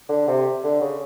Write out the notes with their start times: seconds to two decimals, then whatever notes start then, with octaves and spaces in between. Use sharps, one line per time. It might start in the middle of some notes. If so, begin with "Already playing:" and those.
0.09 D3
0.28 C3
0.64 D3
0.82 C#3